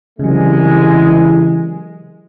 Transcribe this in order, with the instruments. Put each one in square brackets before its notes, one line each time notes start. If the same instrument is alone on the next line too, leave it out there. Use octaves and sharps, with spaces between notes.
[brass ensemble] C2 G#3 [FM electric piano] C#3 F#3 [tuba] E3